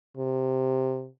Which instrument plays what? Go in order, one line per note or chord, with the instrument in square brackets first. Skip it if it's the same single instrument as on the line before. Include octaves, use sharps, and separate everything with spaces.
[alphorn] C3